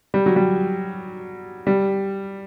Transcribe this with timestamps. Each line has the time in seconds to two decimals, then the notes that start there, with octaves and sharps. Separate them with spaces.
0.14 G3
0.26 F#3
0.36 G3
1.67 G3